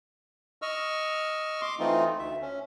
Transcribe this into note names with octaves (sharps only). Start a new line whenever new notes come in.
D#5 C#6 E6 F6
C6 D6
E3 A3 C4 D#4 F4
D2 E5
C#4